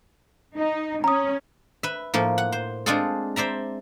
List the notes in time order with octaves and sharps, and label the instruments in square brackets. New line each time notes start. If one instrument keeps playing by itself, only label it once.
[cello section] D#4
[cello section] C#4 [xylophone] A#5 D#6
[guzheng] B4 E5
A2 F3 A#3
F#5
C5
G#3 C4 D4 F4 G#4 A4
C5 D5 E5 A#5